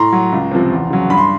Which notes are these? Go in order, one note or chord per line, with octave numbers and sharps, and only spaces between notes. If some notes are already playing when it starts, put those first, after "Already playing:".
Already playing: A2 A#5 C6
F#3
C#2
C3 F3
E2
C#3 F#3
G2 B5
C6